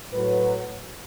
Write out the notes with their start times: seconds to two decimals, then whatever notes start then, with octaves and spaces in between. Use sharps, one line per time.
0.13 A2 F#3 B4